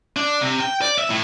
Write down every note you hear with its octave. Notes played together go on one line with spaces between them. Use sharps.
D4
C3
G5
D5
E5
A2